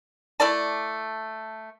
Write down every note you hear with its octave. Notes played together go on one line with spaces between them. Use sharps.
A3 E4 D5 A5